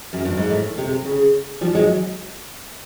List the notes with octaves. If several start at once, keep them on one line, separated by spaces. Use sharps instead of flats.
F#2
G2
G#2
A2
C3
C#3
F3 G3
F#3 G#3